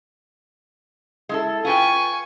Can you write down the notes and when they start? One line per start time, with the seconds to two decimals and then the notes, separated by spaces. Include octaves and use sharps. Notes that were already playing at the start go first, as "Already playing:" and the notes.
1.29 G#3 E4 A4
1.65 F4 B4 G5 G#5 C#6